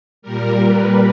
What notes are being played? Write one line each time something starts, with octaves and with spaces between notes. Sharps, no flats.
A#2 G3 A#4
B4